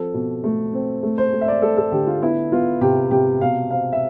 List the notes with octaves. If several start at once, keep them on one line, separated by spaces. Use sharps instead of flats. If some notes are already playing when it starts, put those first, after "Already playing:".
Already playing: F3 C4 A4
B2
A3
C4
A3
C5
A3
E5
D5
A3 A4
A4
D3 G4
F4
B3 E4
B3 F4
C3 G4
C3 G4
B2 F5
C4 F5
E5